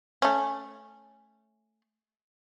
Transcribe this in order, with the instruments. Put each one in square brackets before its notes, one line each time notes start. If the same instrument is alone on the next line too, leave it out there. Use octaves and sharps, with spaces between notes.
[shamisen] A3 C#4